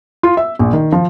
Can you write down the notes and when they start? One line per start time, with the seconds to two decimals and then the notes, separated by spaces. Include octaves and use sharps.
0.23 F4
0.37 E5
0.59 A#1
0.73 D#3
0.92 F3